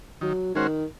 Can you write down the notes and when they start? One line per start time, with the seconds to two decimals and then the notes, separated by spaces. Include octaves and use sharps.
0.21 D#3 F#3
0.55 D#3 G#3 C#4 F#4 C5